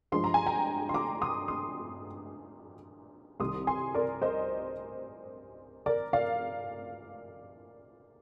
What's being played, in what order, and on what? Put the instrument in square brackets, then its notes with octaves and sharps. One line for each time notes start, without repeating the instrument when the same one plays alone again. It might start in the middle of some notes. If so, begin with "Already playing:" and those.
[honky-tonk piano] G2 F3 G#3 C6
A#5
G#5
G5 A#5
C6
A#5 D6
C6 D#6
C6 D#6
C2 C3 D#3 G3 C6 D#6
G#5 C6
A#4 D5
C5 D#5
A#4 D5
D5 F5